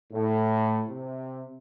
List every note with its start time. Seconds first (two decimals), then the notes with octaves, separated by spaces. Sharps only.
0.13 A2
0.89 C3